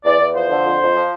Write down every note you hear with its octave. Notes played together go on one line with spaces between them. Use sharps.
E2 D5
E2
F3 C5
D3
F2
F2
F3